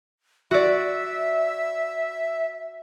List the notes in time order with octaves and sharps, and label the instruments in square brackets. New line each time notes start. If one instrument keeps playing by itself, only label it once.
[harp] F#4 D5 [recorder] E5